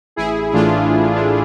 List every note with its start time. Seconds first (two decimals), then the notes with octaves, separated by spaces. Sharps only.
0.16 A1 E4 G#4
0.53 A2 E3 A3 D4 F4
0.89 A1
1.14 D4
1.26 A2 E3 A3